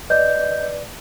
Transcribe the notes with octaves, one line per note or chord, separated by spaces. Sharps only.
B4 D5 D#5 G6